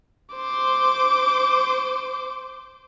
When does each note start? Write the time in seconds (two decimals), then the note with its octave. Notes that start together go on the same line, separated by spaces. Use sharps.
0.35 C5 D6